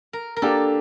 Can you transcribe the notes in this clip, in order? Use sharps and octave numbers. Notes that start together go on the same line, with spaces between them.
A#4
A#4
A#3 D4 G4 A4